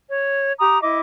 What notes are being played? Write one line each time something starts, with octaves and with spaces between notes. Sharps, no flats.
C#5
G4 A#5 D#6
E4 D#5 D6